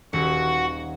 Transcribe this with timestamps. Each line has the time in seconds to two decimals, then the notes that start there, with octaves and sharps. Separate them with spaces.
0.13 D#1 F#4 F#5